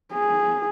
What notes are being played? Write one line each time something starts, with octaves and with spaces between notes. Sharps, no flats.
G#4